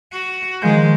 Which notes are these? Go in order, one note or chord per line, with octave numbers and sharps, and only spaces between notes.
F#4
D#3 F3 G#3 G6